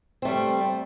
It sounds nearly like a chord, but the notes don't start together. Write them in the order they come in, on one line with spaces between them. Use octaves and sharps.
C4 A3 G3